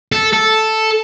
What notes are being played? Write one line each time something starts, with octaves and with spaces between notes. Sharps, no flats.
A4
A4